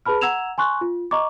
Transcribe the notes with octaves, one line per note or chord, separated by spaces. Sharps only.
G#4 B4 A5 B5 F6
F#5 A#5 E6 G#6 E7 F7
G#5 C6 C#6 F#6
F4
D#5 A#5 C#6 D6